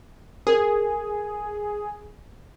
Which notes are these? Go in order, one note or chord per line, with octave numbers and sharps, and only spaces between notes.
G#4 A#4